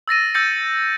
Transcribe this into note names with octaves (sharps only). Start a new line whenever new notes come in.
E6 A6 A#6 D#7
E6 G6 A6 A#6 C#7